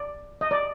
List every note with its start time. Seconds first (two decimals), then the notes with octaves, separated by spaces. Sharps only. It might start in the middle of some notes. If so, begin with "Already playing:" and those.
Already playing: D5
0.41 D#5
0.51 D5